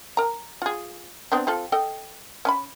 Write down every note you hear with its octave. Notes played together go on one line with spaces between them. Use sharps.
A#4 A#5
F4 G#4
B3 C4 D4
C4 F4 A4
A4 D#5 G5
C#4 G#5 B5